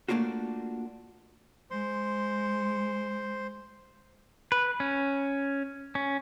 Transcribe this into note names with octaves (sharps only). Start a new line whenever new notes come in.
A3 A#3 D4 F4 F#4
G#3 C5 C6
B4
C#4
C#4